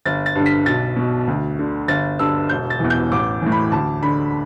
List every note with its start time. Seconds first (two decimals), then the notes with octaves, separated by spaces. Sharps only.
0.06 G1 A6
0.26 A6
0.35 G2 D3
0.46 B6
0.66 B1 A6
0.96 B2
1.27 D2
1.59 D3
1.88 G1 A6
2.19 G2 D3 E6
2.49 E1 G6
2.70 A6
2.80 E2 E3
2.90 G6
3.12 A1 D6
3.42 A2 E3
3.52 B5
3.72 D2 A5
4.03 D3 B5